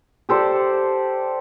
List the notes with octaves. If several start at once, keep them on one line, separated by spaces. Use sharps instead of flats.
G4 A4 C5 D5